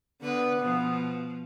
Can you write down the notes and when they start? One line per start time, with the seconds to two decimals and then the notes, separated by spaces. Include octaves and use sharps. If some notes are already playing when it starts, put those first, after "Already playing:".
0.22 D3 B3 B4
0.61 B2 F3